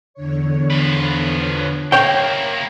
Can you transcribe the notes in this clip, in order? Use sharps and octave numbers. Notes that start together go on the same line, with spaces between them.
E2 D3 C#5
F3 B4
A#3 E4 C#5 G5